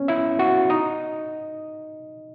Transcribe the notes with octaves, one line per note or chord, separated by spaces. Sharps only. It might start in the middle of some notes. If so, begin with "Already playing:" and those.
Already playing: B3 C#4 C#5
E4 E5
F#4 F#5
D#4 D#5